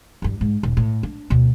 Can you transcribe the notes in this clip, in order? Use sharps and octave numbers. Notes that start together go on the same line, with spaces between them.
E2 G2
G#2
D#1
A2
D4
D2 B2